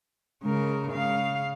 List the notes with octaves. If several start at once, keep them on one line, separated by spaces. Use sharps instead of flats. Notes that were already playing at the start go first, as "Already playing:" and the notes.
C#3 G#3 A#4
C#3 F5